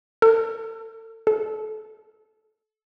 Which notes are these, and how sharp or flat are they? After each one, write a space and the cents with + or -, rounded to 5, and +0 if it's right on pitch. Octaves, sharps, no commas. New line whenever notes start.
A4 +40
A4 -25